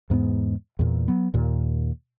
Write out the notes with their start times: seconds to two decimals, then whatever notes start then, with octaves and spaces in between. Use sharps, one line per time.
0.10 E2 G#2 A#3 B3
0.79 E2 A#2
1.08 F#3 B3
1.34 D#2 A#2